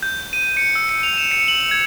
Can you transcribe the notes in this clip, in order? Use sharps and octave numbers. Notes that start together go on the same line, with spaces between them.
G6
D#7
C#7
E6
C#7
F7
E7
C#7
F#7
G#6